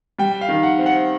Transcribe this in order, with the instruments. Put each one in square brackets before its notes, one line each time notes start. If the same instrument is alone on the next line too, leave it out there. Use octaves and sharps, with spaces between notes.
[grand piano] G3 G5
F5
D#3
F#5
C4
F#5